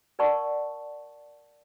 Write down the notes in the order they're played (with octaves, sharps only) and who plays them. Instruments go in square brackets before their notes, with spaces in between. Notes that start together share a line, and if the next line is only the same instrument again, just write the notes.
[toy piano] A#4 D5 F#5 A5 C#6